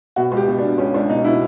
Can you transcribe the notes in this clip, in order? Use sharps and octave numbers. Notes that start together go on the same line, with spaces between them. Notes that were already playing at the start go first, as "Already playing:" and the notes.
B2 F#4
C#2
G4
B2
D4
B2
C#2 C#4
C#2 D4
B2 D#4
B2 E4